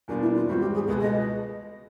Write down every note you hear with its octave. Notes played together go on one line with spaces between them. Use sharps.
E2 B2 G3 A#3 D4 F4
E4
F4
G#2 E3 G3 C4 F#4
G4
G#4
C#2 B2 G#3 B3 A4
D#5